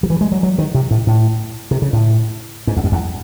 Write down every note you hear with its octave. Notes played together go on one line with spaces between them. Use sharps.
F#3
E3
G#3
F#3
F#3
D#3
C3
A2
A2
C3
C#3
A2
G#2
E2
F#2
E2